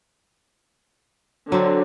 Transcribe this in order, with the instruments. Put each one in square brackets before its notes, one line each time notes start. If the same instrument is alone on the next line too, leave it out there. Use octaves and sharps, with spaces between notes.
[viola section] D3 [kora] F#3 C4